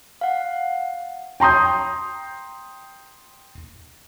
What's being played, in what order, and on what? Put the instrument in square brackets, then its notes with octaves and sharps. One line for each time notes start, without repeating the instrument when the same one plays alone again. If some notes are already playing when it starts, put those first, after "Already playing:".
[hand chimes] F5 F#5
[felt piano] G5 A#5 C6 D#6 G6